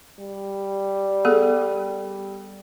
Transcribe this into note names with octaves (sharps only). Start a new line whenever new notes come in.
G3
B3 G#4 A4